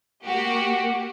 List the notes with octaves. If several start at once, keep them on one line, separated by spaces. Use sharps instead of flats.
A#3 F#4 G4